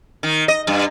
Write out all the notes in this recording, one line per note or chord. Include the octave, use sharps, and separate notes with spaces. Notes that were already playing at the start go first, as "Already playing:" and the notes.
D#3
D#5
G2